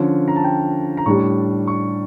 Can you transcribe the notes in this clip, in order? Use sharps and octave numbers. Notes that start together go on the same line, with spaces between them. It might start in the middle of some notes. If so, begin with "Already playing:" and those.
Already playing: D3 F3 C#4
A#5
A5
G5
A#5
A2 G3 D4 C#6
C#6